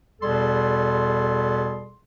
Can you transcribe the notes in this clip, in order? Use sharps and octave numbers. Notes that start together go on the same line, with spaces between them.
E2 B2 G3 G#4 A4 C6